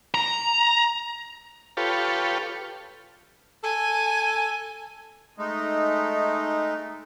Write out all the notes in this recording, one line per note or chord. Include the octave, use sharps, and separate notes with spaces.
A#5
F4 G4 A4 B4 C#5
A4 G#5
G#3 A3 D#4